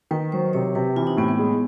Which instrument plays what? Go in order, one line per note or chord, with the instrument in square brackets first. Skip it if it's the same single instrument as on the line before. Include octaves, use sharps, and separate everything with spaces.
[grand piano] D#3 [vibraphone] B4
[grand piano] F#3 [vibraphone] C5
[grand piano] C3 [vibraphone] C#5
[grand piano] C3 [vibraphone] B4
[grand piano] E3 [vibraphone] F4
[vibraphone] D#4
[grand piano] A2 [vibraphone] B3
[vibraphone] B3
[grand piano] G#3